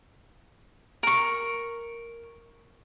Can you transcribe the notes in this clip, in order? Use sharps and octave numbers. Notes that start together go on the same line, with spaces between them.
A#4 C#6